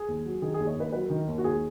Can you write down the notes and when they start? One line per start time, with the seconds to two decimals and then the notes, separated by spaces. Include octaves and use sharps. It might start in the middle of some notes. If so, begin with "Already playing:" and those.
Already playing: G#4
0.08 D#2
0.25 F#3
0.42 D#3 G#4
0.54 G#4
0.59 D#2
0.67 C#5
0.77 D#2 B4
0.93 F#3 B4
1.06 A#4
1.10 D#3
1.19 A#4
1.28 D#2
1.38 F#4
1.44 D#2 G#4